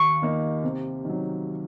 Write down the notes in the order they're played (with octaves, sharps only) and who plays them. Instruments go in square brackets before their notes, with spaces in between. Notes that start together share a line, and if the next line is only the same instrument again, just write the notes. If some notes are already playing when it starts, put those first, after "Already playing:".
Already playing: [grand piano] D#2 [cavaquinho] C#6
[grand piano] D#3 A#3 D#4
C3
D#3 F#3